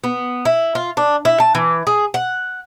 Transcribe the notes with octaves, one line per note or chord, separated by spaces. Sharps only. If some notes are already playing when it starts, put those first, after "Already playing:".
B3
E4
F4
D4
E4
A5
E3
G#4
F#5